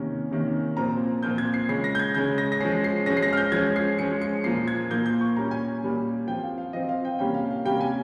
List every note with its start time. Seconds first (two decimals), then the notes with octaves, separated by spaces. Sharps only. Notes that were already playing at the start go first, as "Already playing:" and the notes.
Already playing: C3 D#3 A#3 C#4
0.31 C3 D#3 A#3 C#4
0.77 A#2 F3 C4 A#5
1.23 A#2 F3 C4 G6
1.38 G#6
1.54 C7
1.68 C#3 G#3 C#4 C7
1.84 A#6
1.95 G6
1.99 G#6
2.14 C#3 G#3 C#4 G6
2.38 A#6
2.52 A#6
2.61 F3 G#3 C#4 C7
2.84 C7
3.06 F3 G#3 C#4 A#6
3.17 C7
3.23 A#6
3.33 F6
3.37 G6
3.52 F3 G#3 C#4 G#6
3.76 C7
3.99 F3 G#3 C#4 C#7
4.21 C#7
4.44 A#2 F3 A#3 C7
4.68 G#6
4.90 A#2 F3 A#3 G6
5.06 G6
5.21 C#6
5.36 A#2 G3 C#4 A#5
5.51 G#5
5.82 A#2 G3 C#4
6.28 F3 C4 G5
6.43 F5
6.58 F5
6.73 F3 C4 D#5
6.89 F5
7.05 G5
7.19 C3 G3 A#3 C#4 G5
7.34 F5
7.51 F5
7.65 C3 G3 A#3 C#4 G5
7.81 G#5